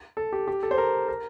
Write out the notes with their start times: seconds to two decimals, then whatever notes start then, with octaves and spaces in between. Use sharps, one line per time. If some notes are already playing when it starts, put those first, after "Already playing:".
0.17 A4
0.33 G4
0.48 G4
0.63 A4
0.71 C5
0.78 A#4
1.08 A#4